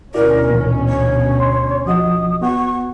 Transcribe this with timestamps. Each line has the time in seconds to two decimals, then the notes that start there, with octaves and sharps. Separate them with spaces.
0.14 D2 B2 C#4 E4 F#4 A#4 D5
0.50 A#2 E3
0.89 C#5
1.40 C6
1.86 F3 F#4 D#5 D#6
2.41 B3 F#4 F#5 C#6